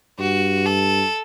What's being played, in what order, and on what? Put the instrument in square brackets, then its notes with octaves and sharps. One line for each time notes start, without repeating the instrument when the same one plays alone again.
[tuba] G2 [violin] F#4
[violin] A4